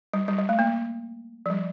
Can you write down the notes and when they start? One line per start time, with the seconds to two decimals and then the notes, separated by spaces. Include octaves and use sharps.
0.13 G3
0.28 G3
0.39 G3
0.49 A3
0.59 A#3
1.46 F3
1.50 G3